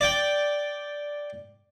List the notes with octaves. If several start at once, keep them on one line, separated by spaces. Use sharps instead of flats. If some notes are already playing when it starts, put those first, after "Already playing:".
D5 G5